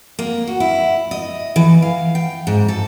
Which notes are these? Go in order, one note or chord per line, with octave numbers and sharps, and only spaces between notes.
A#3
F#4
E4
D#5
E3
F5
G5
G#2
A4